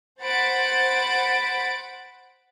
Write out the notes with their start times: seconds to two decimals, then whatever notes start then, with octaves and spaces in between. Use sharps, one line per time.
0.22 C5 F#5 B5 A6 D7